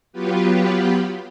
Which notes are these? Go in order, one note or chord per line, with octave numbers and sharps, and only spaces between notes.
F#3 B3 F4 G4 B4